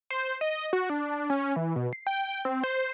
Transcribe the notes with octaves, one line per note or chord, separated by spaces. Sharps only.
C5
D#5
F#4
D4
C#4
E3
B2
C7
G5
C4
C5